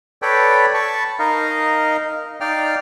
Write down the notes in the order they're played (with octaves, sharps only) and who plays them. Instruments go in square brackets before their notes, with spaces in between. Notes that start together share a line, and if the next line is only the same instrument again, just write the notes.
[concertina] A4 B4 C#5 D5 G5 B5
A5 B5 C#6
D#4 A#4 D#5 F5
D#4 D5 F5 G5 F6